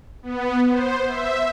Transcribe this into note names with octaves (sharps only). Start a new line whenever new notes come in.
B3
C5
E5